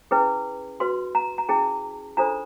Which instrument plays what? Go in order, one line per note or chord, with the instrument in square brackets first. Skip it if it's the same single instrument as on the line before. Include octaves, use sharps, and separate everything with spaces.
[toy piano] C#4 E4 G#4 B4
F#4 B4 C6
A#5
A#5
C#4 E4 G#4 A5
D4 F4 A4 C5 A#5